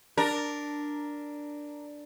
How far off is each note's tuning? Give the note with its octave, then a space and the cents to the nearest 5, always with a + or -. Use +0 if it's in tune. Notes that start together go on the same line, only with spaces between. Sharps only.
D4 +0 A#4 +0